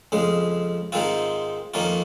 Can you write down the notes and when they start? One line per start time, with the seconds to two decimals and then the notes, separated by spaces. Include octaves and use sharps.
0.12 F2 C#3 G#3
0.92 G#2 D#3 G#3 C4 F4
1.74 F2 D#3 A#3 C#4 F4